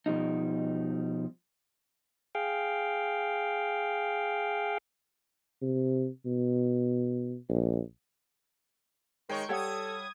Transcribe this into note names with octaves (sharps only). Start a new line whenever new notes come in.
B2 F3 G3 D#4
G#4 F5 G5
C3
B2
A#1
D#3 G#3 C#5 G5 A#5 C#6
G3 G4 A4 C#5 F#5 D#6 G#6